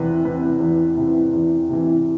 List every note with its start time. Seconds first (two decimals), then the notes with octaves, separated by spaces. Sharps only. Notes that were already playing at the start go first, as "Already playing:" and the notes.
Already playing: E2 C3 E3 B4
0.25 C3 E3 B4
0.60 E2
0.97 C3 E3
1.33 E2
1.69 C3 E3